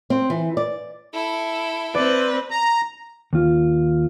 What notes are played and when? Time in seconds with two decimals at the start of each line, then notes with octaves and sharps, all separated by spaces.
0.10 C4
0.30 E3
0.57 D5
1.14 E4 A4
1.95 C4 B4 D5
2.51 A#5
3.33 D#2 F4